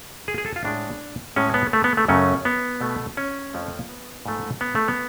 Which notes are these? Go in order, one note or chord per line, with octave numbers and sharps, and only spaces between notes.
G#4
G#4
A4
F4
A2 G#3 D4
A2 G#3 C#4
B3
A3
B3
A3
F#2 C#3 F#3 A3 C#4
B3
B2 A3
C#4
F2 F3 A3
B3
G#2 F3 A3
B3
A3
B3